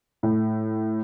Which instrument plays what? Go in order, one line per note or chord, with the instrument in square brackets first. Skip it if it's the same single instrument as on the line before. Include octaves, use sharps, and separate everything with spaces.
[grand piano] A2